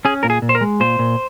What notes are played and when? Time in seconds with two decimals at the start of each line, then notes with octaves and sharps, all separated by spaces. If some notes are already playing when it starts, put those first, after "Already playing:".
0.05 C#4 G#4
0.23 A#2 A#4
0.30 G#4
0.42 A#2
0.49 C5
0.55 A#4
0.61 G#3
0.80 A#2 C5
0.99 A#2